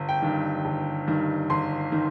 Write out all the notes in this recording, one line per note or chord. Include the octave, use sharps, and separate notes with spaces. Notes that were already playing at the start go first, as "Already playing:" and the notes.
Already playing: G1
G5
G2 D#3
G1
G2 D#3
G1 C6
D#3